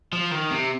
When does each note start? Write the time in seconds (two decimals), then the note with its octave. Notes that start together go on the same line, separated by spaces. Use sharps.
0.13 F3
0.32 D#3
0.51 C3